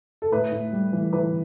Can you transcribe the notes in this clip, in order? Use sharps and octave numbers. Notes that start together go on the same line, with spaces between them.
A4
A2 B4
A2
G3
E3
E3 B4